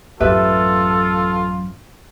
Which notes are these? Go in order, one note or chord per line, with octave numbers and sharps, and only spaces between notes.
A1 F#2 F4 G4 A4 B4 E5